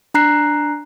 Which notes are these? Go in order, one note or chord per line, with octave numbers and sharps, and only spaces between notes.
D4 A#5 F#6 C7